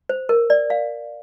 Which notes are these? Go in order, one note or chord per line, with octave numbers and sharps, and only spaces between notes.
C5
A#4
D5
F5